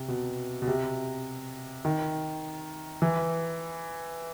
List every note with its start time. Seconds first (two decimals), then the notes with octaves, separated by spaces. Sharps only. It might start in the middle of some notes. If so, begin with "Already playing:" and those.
Already playing: C3
0.08 B2
0.62 B2
0.67 C3
1.85 D#3
3.02 E3